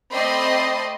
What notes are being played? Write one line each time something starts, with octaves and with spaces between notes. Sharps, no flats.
A3 C4 D5 D#5 B5 C6